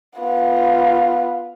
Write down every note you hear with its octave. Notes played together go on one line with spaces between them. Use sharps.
B3 F4